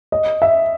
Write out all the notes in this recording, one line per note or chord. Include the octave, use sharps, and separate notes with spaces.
D#5
E5